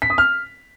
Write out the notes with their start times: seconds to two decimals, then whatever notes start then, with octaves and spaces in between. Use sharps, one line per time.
0.02 B6
0.10 D#6
0.18 F6